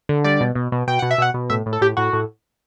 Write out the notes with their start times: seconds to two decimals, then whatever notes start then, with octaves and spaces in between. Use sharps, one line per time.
0.09 D3
0.24 G3 D5
0.41 B2
0.55 B2
0.72 B2
0.87 B2 G5
0.99 B2 F#5
1.11 E5
1.18 B2 F#5
1.34 B2
1.50 A2 E5
1.66 A2
1.73 A4
1.81 A2 G4
1.97 A2 F#4
2.13 A2